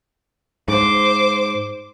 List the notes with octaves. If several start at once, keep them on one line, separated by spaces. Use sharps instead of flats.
G#2 C5 D6